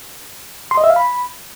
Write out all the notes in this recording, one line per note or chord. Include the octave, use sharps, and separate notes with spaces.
C6
D#5
E5
F5
B5